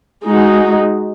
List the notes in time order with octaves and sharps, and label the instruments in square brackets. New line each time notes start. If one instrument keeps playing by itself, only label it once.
[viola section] G#3 D#4 F#4